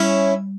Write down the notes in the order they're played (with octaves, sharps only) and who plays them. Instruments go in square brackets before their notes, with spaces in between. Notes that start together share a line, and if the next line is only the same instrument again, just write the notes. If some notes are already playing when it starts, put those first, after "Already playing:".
Already playing: [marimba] G3 [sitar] C#4 E4